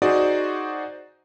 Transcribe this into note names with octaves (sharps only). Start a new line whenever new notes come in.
D#4 F#4 G#4 C5 D5